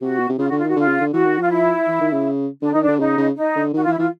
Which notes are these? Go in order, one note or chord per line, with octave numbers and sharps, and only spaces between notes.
C3 F#4
B2
C3
C#3 F4
D3 F#4
F4
D#3
F#4
D3 F4
C#3
D3
E3 F#4
D#3
F3 F4
E4
E3
D#3
C#3
D3 D4
D#3 D#4
D4
D3
C#3 D#4
C#3
D#4
D3
D#3 F#4
F4
E3
E4
E3 F4